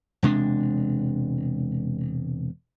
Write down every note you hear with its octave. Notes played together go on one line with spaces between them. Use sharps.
E1 C3 G#3 D4